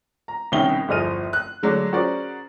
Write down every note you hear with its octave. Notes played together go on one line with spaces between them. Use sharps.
A#5
C2 B2 D#3 C#4 E5 G7
G1 E2 F3 D#5 F6 D#7
F#6
D3 F#3 G#3 A3 D4
C#4 F#4 G#4 A#4 C5 D5